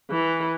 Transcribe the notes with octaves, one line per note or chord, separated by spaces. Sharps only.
E3